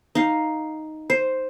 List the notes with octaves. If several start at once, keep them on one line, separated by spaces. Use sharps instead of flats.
D#4 F5
C5